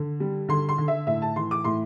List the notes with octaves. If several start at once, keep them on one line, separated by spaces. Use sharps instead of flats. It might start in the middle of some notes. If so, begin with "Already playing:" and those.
Already playing: D3
G3
D3 C6
C6
D3
E5
A2 E5
A5
E3 C6
D6
A2 C6